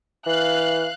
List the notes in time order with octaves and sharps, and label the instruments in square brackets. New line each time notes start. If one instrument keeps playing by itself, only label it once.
[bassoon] E3 [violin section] F5 F#6